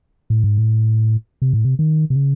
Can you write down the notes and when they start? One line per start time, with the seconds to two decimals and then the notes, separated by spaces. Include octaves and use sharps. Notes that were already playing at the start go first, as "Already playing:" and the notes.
0.30 A2
0.44 G#2
0.57 A2
1.42 C3
1.53 A2
1.64 C3
1.79 D#3
2.10 C3
2.16 C#3